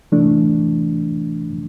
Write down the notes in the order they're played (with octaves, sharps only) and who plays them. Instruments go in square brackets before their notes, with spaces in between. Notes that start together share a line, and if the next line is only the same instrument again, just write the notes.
[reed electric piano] C3 E3 A3 D4